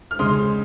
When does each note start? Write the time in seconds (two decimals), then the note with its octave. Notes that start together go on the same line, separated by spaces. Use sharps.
0.11 F6
0.19 C#2 C#3 G#3 C6 D#6